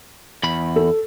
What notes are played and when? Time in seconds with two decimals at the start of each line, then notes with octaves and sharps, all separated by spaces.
0.43 E2 B5
0.76 A4